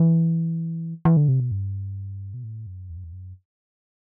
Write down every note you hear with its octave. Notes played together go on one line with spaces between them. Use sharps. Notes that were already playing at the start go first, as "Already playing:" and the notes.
Already playing: E3
E3
D3
C3
B2
G2
B2
A2
F#2
E2
F#2
E2
F#2